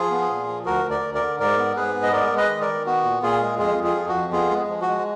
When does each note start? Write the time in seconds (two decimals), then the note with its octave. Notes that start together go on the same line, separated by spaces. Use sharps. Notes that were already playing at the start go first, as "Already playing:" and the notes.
Already playing: F3 F4 G#4
0.11 B3
0.30 A#2
0.48 F3
0.66 D2 F#4 A#4
0.84 D2
0.90 A#4 D5
1.03 D2
1.14 A#4 D5
1.22 D3
1.39 G#2 A#4 D5
1.58 B3
1.76 G#2 G#4 B4
1.94 B3
2.03 D#5
2.12 G#3 A#4 D5
2.31 G#3
2.37 B4 D#5
2.49 D#3
2.61 A#4 D5
2.67 D#3
2.86 B3 F#4
3.04 A#2
3.22 A#2 F4 G#4
3.41 G#3
3.59 F2 F4 G#4
3.77 F2
3.84 F4 G#4
3.95 F3
4.08 F#4
4.14 F2
4.32 B3 F4 G#4
4.50 G#3
4.69 F3
4.81 F#4
4.88 G#3